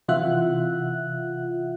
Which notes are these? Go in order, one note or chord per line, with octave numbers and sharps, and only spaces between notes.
C3 E3 F4 E5 F#5 F#6